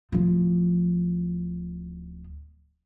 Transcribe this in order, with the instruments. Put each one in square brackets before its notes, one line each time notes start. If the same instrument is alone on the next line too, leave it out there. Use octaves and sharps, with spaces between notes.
[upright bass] D1 F3